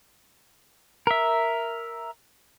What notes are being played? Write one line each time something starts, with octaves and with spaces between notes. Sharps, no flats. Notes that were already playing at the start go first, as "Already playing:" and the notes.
A#4 E5